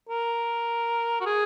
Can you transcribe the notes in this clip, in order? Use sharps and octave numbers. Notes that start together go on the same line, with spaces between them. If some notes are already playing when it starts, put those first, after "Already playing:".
A#4
F#4
G#4